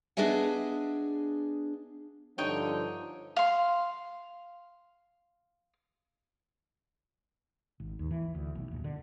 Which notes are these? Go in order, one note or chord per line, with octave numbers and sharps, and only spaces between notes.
B3 D4 G#4 D#5 E5 G#5
G2 D3 F3 D#4 C#5 G5
F5 C6
G#1
D#2
E3
D2
B1
D#1
D3